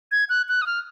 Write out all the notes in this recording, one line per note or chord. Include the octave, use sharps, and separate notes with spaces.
G#6
F#6
F#6
D#6
F6